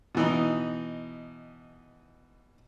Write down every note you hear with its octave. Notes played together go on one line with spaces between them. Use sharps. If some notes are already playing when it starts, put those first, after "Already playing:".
B2 E3 D#4